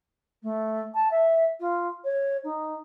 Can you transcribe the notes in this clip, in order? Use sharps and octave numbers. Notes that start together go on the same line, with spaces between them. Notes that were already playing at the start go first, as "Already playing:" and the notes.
A3
A5
E5
F4
C#5
D#4